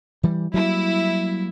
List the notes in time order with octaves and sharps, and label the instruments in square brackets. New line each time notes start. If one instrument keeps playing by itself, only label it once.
[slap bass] E3 G3
[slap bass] F#3 G3 A#3 [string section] E4